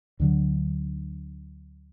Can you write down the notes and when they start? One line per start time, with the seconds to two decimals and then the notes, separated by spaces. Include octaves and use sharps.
0.20 D2 D3 F#3